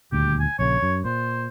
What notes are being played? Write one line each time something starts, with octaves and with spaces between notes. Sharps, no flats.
D#1 D2 G4
G#5
A#1 C#3 C#5
F#2
A#2 C5